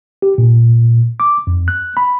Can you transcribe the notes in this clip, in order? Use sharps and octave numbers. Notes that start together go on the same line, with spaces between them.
G4
A#2
D6
F2
F#6
B5